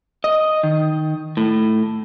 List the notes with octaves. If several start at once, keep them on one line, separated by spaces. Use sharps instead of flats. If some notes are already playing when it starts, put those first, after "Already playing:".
D#5
D#3
A2